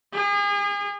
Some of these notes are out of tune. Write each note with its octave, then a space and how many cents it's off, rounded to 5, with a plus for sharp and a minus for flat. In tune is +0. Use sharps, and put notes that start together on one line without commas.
G#4 -35